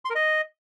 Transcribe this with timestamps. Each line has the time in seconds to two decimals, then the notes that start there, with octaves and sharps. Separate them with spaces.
0.05 C6
0.10 A#4
0.15 D#5